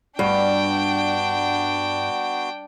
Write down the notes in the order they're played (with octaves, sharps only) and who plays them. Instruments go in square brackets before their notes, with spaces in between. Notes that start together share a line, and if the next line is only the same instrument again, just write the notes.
[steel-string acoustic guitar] G2 [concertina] B3 F#4 [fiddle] D4 G5